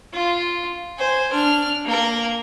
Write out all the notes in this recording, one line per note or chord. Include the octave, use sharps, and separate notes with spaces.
F4
C5 G#5
D4 F6
A#3 A#4